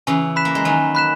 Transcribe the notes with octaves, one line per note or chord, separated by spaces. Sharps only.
C#3 E3 G#5
B5 F#6 B6 E7
A#3
G#3
D#3 F#3 G#5
B5 F#6 B6 E7